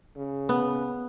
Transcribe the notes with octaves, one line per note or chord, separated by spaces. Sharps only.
C#3
B3